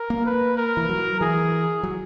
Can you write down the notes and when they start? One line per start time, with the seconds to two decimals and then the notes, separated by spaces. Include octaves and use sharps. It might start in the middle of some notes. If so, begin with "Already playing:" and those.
Already playing: A#4
0.10 A#3
0.26 B4
0.57 A#4
0.77 E3
0.89 F#3
1.20 E3 G#4
1.83 F#3